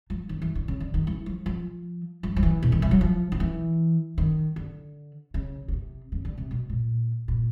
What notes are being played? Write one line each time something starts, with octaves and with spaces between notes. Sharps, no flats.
F3
D#3
E3
D3
C#3
D3
D#3
E3
F3
F3
F3
F3
E3
B2
D#3
E3
F#3
F3
D#3
E3
D#3
D3
C#3
C#3
C3
C#3
D3
C3
B2
A#2
A#2